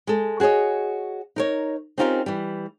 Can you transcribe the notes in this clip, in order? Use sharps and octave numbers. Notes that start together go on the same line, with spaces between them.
G#3 A4
F#4 G#4 C5 C#5 D#5
D#4 A#4 C#5
C4 C#4 D#4 F4 G4 A#4
E3 G3